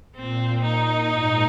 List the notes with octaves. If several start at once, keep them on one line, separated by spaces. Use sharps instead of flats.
A#2 C4
A#2 D#4
G#2